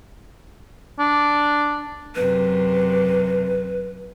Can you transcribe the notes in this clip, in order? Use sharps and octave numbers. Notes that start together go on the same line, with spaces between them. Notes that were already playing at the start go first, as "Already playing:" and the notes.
D4
F#2 C3 B4